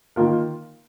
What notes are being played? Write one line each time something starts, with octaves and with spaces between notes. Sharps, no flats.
D#3 A#3 F4 A#4